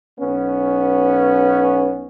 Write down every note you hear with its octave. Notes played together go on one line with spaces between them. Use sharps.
B1 B3 C#4